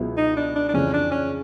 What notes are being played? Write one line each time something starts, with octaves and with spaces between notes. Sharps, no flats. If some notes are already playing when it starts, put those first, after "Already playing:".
Already playing: C#2 B2 F#3 B3 E4
D#4
D4
D4
D4
F2 C#3 E3 C#4
D4
C#4